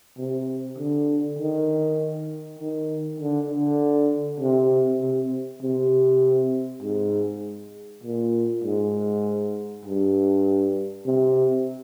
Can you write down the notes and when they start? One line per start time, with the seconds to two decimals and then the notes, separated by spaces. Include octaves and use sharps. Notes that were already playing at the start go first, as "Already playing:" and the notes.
0.18 C3
0.78 D3
1.39 D#3
2.59 D#3
3.20 D3
3.50 D3
4.41 C3
5.01 C3
5.62 C3
6.83 G#2
8.03 A#2
8.64 G#2
9.86 G2
11.06 C3